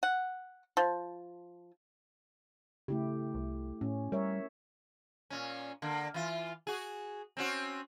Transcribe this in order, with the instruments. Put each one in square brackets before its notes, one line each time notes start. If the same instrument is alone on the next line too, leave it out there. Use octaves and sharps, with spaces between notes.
[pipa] F#5
F3
[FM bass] C#3 [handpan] A3 E4 G4
[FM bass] C2
[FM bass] A2 [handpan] C#4
[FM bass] G3 [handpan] A#4 C#5 E5
[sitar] A#2 C#4
D3 A#3
E3 F4
F#4 G#4
C4 C#4 F#4